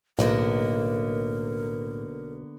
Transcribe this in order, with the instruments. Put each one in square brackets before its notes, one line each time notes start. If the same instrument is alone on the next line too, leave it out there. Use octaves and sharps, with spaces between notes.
[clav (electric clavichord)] B1 [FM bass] A2 [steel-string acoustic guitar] D3 A#3 B3 [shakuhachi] A#4